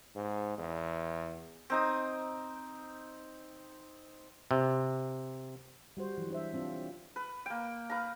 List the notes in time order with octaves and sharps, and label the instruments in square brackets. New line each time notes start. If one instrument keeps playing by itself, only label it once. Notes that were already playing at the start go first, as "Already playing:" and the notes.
[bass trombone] G#2
E2
[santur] C4 D#4 D#6
[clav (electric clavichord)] C3
[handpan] G3 F#4 C5
E3 F#3
D4 C5 E5
C4 D4 F4
[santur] B4
A#3 G5
B4 F5 A#5